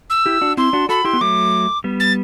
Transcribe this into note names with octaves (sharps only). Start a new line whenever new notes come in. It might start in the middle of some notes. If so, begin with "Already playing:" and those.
E6
E4 G4
D4 F#4
C4 E4 C6
D4 F#4
F#4 A4 B5
E4 G4 C6
B3
F#3 A3 D6
G3 B3
A6